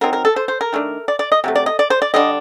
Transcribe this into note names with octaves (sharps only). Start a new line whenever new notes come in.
F#3 C4 D#4 A#4
A#4
A4
C5
C5
A#4
D#3 A3 D4
D5
D5
D#5
C3 F#3 A3
D5
D#5
D5
C5
D5
D3 G3 D4 D#5